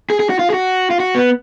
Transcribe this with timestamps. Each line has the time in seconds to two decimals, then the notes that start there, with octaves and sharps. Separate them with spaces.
0.10 G#4
0.20 G#4
0.30 F#4
0.39 F4
0.50 G#4
0.54 F#4
0.90 F4
1.00 F#4
1.15 B3